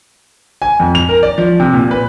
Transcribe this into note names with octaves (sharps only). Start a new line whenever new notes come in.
G#5
F2
F7
A#4
D5
F3
C3
A#2
B4